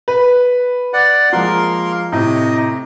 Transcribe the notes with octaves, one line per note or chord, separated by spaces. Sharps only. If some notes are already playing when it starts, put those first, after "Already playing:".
B4
D5 F#5
F3 G#3 A#3 A#4 C6
A2 C3 D#4 D#5